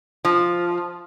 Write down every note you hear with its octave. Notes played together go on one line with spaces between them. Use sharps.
F3